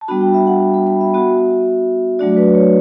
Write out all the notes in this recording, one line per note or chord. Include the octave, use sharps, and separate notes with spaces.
A5
G3 B3 D4 F#4 B5
G5
E5
F#5
B5
B5
E5
B3 F#4
F#3 A3 D4 F#4 D5
B4
C#5